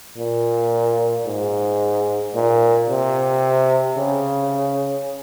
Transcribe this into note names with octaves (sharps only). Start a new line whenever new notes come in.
A#2
G#2
A#2
C3
C#3